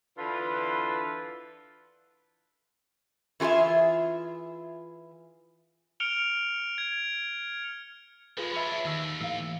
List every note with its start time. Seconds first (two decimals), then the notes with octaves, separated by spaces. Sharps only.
0.18 D3 E3 F4 B4
3.40 E3 F4 G4 G#4 E5
6.00 F6 C#7 D7 F7 G7
6.78 G#6
8.37 F3 G#3 F4 G#4 B4
8.52 C#4 D4 E5 B5
8.85 D#2 D#3 E6
9.21 A2 E3 F5 E6